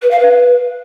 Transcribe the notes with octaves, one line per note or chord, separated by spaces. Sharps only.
B4
F5
B4